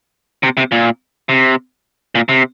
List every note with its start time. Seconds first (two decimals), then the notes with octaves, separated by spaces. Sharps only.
0.43 C3
0.57 C3
0.72 A#2
1.29 C3
2.15 A#2
2.29 C3